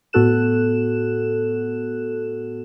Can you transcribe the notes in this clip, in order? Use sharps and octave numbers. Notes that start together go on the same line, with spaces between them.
A2 B3 F#4 A4 F#6 E7